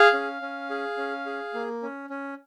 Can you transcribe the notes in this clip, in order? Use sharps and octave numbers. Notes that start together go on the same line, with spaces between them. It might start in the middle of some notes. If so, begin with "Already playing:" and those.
Already playing: G#4 F5
C#4
C#4
G#4
C#4
G#4
A#3
C#4
C#4